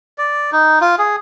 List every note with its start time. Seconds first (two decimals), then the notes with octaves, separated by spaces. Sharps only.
0.18 D5
0.52 D#4
0.81 F4
0.98 G#4